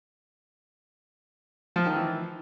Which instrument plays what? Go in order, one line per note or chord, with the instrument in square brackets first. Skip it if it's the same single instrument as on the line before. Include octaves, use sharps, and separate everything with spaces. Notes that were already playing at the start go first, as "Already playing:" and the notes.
[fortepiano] F3
D#3
E3